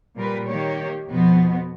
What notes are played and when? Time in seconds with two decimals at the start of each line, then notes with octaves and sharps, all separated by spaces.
0.16 A#2 G3 A#4 B4
0.48 D#3 A#3 G4 C#5
1.08 F2 B2 F3 B3